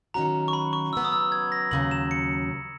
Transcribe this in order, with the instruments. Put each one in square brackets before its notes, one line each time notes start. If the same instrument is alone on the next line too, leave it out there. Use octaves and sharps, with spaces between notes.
[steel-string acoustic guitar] D#3 F#3 C#4 F#4 [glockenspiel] A#5
[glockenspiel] C#6
B5
C#6
[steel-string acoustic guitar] C#3 F#3 B3 [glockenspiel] E6
[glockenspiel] D#6
E6
G#6
A#6
[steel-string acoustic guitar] D#2 C#3 F#3 [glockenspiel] F#7
[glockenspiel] E7
C#7